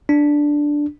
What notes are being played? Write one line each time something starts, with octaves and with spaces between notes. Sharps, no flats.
D4